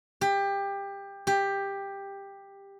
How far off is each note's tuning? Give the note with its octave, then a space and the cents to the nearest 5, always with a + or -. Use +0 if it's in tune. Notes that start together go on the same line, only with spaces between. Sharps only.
G4 +20
G4 +10